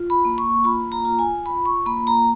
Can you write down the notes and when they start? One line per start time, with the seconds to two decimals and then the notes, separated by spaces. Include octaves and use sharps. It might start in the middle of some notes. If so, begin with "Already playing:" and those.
Already playing: F4
0.10 B5
0.25 A#3
0.38 C#6
0.64 F4 B5
0.92 A#5
1.05 F4
1.19 G#5
1.45 F4 B5
1.66 C#6
1.86 A#3 B5
2.07 A#5